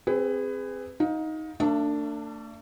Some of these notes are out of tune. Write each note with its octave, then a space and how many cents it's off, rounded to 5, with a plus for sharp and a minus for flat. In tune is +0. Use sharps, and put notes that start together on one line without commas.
C4 +0 G#4 -15 B4 +25
D#4 +15 F5 +35
A3 +45 D4 +0 E5 +40